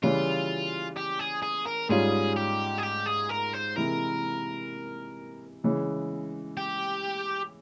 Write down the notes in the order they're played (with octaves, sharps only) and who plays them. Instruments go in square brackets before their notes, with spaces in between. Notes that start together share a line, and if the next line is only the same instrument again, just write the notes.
[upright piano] C#3 E3 G3 C#4 [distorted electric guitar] F4
[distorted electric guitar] G4
G#4
G#4
A#4
[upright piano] G#2 G3 C#4 F4 [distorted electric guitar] G#4
[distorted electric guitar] G4
G#4
G4
G#4
A#4
C5
[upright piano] C3 E3 G#3 E4 [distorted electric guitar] A#4
[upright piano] C#3 E3 G#3 C#4
[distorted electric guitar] G4